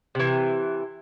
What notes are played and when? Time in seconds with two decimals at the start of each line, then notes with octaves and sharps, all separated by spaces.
0.15 C3 E3